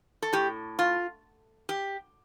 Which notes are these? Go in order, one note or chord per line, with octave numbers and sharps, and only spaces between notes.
A4
A2 G4
F4
G4